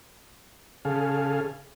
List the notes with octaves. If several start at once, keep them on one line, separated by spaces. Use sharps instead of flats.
C#3 G#4 A4 F5